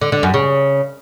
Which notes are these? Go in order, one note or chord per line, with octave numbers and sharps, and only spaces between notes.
D3
D3
F#2
C#3